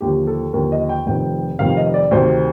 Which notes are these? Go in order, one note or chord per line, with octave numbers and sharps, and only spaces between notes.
D#2 D3 F3 G4
A4
D#2 D3 F3 A#4
D#5
G5
F1 F2 C3 D#3 G5
F1 F2 C3 D#3 F5
D#5
D5
D2 C3 D#3 C5